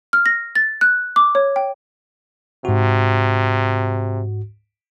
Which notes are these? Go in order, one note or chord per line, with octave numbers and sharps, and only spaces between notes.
F6
A#6
A6
F#6
D6
C#5
G5
G#2 C3 F#4